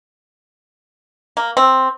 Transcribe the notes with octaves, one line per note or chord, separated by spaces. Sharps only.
A#3
C4